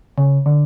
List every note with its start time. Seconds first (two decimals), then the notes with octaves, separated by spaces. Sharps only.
0.18 C#3
0.46 D3